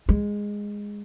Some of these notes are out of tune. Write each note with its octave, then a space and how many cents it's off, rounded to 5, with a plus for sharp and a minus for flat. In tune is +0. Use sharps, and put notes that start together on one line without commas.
G#3 -10